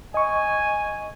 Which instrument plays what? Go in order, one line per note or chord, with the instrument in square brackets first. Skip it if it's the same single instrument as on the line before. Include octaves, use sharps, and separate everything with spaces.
[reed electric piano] D#5 C#6 [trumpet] G#5